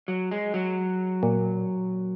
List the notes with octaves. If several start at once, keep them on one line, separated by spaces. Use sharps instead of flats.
F#3
G#3
F#3
A#2